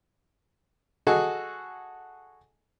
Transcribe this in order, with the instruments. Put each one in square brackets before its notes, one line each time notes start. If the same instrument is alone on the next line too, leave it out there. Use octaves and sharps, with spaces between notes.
[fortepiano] F#4 G#4 A4 D#5 F#5 G#5